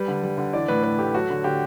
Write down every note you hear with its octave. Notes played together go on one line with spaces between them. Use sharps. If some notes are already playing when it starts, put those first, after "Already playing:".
Already playing: G3 B4
D3
G3
D3
E3 D5
A2 B4
A2 B4
A3 G4
F#3 F#4
D3
D3 G4